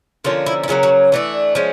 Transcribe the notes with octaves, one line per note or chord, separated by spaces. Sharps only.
D3 F3 A#3 C#4 F4
E4
E4
C#3 F#3 A#3 F4
F#4
E3 A3 D4
F3 G#3 C#4